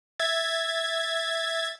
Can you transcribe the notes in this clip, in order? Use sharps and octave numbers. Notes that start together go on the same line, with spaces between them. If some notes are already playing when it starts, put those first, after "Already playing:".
E5 G#6 A6